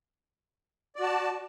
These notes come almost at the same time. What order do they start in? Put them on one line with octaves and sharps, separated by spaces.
D5 F#4 A5